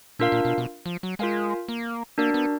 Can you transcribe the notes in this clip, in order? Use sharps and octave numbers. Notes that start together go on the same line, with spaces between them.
A#2 D4 F4 A#4 F5
A#2
B2
B2
F3
F#3
G#3 F4 A#4 F5 G#5
A#3
A#3 D4 F#4 A#4 D5
B3